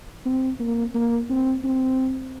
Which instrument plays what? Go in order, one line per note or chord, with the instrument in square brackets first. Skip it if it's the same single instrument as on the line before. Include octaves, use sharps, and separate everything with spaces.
[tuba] C4
A#3
A#3
C4
C4